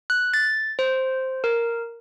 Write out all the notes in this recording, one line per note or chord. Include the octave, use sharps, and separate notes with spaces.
F#6
A6
C5
A#4